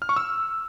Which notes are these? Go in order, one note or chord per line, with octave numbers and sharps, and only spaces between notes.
F6
C#6
E6